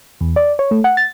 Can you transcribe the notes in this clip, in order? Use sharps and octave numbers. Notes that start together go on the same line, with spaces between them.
E2
D5
C#5
A3
F#5
A6